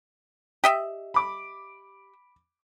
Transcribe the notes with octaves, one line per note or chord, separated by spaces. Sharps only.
G4 D#5 E5
B5 D6